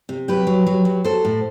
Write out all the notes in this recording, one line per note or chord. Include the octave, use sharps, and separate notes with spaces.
C3
F#3 G4 B4
F#3
F#3
F#3
F#3 A4 C5
A2